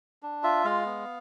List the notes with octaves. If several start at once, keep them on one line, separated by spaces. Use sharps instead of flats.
D4
F4 E5
G#3 F5
B3